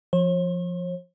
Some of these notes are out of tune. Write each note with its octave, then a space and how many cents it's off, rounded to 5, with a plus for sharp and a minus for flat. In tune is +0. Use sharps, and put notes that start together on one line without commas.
F3 +0 C#5 -45